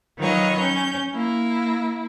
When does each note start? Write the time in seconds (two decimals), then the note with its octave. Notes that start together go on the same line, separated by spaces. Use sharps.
0.18 D#3 F#3 F4 B4 C#5 D#5
0.58 C#4 G6
1.14 A#3 E4